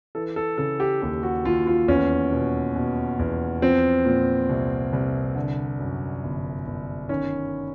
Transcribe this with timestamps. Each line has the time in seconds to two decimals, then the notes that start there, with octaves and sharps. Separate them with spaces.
0.15 E3 A4
0.36 A4
0.58 C#3 A4
0.80 G4
1.02 D#2 G4
1.23 F#4
1.45 D#2 F4
1.67 F4
1.88 E2 C#4
2.32 B2
2.76 B2
3.19 E2
3.62 F3 C4
4.05 A#2
4.49 C2
4.93 C2
5.36 D3
5.79 F#2
6.24 G1
6.66 G1
7.09 D#3 C#4